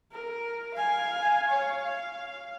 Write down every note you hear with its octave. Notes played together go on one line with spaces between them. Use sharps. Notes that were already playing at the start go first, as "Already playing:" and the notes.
A#4
F5 G#5
C#5 F5
F5